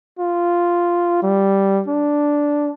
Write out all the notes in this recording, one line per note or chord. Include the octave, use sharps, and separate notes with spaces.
F4
G3
D4